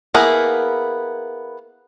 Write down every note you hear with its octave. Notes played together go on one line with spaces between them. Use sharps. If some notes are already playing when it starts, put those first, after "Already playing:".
A#3 B3 E4 G#4 A#4